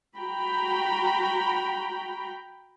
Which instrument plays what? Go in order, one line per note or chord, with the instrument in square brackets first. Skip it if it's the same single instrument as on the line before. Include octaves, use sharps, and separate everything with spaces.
[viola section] F#4 G5 A#5 B5